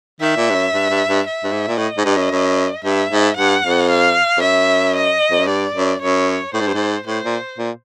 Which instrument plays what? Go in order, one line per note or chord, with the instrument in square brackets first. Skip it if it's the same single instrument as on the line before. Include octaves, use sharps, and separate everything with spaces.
[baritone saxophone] D#3 [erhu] E5
[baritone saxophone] A#2
G2
F#2
G2
G2
G2
[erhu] E5
[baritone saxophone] G2
G#2
A#2
[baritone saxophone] A2 [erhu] D#5
[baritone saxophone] G#2
G2
F#2
F#2
[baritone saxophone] G2 [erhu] E5
[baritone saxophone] G#2
[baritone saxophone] G2 [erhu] F#5
[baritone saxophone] F2
[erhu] F5
[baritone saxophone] F2
[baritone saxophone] F#2 [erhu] E5
[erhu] D#5
[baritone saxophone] F2
F#2
[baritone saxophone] G2 [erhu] D5
[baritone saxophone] F#2
[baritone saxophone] F#2 [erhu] C#5
[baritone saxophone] A2 [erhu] C5
[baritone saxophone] G#2
G2
G#2
[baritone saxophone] A2 [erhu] C5
[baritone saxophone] A#2
A#2